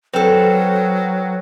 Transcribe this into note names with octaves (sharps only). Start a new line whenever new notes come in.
F#3 C4 A4 B4 C5 G5